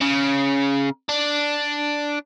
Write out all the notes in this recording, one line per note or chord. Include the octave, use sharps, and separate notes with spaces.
C#3
D4